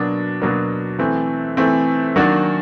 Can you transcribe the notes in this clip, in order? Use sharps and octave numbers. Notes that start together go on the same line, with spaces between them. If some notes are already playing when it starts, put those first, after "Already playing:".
Already playing: B2 F#3 A#3 D4
B2 F#3 A#3 D4
E3 A3 C4
E3 A3 C4
D#3 F#3 A#3 D4 F#4